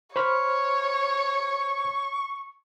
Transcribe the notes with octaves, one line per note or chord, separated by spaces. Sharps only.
C5 C#5 B5 C#6 F6